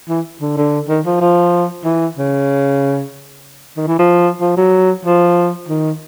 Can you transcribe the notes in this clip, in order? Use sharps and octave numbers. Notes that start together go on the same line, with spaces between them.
E3
D3
D3
D#3
F3
F3
E3
C#3
D#3
E3
F3
F3
F#3
F3
D#3